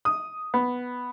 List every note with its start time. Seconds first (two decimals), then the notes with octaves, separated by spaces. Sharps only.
0.05 D#6
0.54 B3